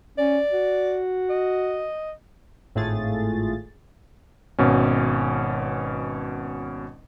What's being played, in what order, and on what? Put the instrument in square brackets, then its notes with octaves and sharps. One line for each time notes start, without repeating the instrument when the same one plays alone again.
[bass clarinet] C#4 [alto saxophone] D5
[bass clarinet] F#4
[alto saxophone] D#5
[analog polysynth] G#1 A2 A3 F4 G#4 A6
[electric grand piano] G#1 B2 C#4